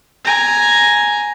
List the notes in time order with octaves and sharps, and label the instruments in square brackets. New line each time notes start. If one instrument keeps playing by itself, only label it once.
[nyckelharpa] G#5 A#5